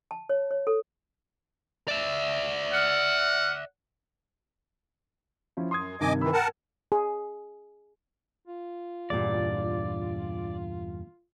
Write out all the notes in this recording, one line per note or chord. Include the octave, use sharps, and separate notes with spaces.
A5
C#5
C#5
A4
D5 E5
F#5 F6
F3 C#4 E4
F#2 C6 D#6 G#6
G2 C3 D#3 D#5 G#5 D6
D#3 E3 B5 E6
A#4 F#5 G5 A5
G#4
F4
E2 G2 A#2 D5